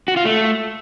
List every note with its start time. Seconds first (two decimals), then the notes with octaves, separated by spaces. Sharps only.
0.08 F#4
0.17 F4
0.25 A3